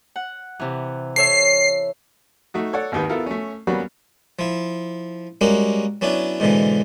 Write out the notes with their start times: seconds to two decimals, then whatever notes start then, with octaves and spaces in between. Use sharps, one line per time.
0.16 F#5
0.60 C3 E3
1.16 A4 C#5 E5 C7
2.54 A3 D#4 F#4
2.73 A4 C#5 D5 F#5
2.92 G#1 D#2 D#3 G4 B4
3.09 B3 E4 F4 A4 A#4
3.26 A3 C#4
3.67 F#3 G3 A#3 B3 C#4 F#4
4.39 F3 E4
5.41 G3 G#3 A#3 C#4 F#4
6.01 F#3 B3 C#4 D4 E4
6.40 G#2 B2 D3 E3